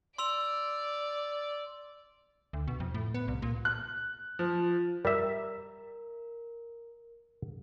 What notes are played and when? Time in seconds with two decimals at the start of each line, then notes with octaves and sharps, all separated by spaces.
0.18 D5 C6 E6 F7
2.53 D2
2.68 B2
2.80 F2
2.94 A2
3.14 B3
3.28 C2
3.42 A#2
3.65 F#6
4.39 F3
5.05 G3 A#4 E5